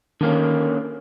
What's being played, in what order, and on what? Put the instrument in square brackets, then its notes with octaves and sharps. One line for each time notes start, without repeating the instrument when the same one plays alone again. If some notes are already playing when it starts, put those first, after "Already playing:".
[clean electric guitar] D3 A#3 C#4 [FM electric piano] D#3